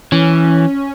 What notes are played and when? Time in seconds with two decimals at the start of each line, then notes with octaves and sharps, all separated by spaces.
0.12 E3 C#4